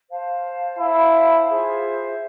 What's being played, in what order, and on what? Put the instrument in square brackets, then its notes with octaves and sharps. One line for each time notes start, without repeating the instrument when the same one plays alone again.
[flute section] C5 F5 A5
[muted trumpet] E4 [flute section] C5 F5 A5
[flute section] F4 G#4 C5 E5